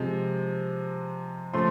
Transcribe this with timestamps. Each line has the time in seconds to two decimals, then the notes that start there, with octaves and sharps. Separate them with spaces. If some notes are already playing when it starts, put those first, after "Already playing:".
Already playing: C3 F3 G#3
1.54 C#3 F3 A3 C6